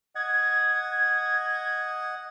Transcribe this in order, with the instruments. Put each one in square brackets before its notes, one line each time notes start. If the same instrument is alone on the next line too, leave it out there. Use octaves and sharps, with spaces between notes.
[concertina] D#5 F#5 [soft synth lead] G#6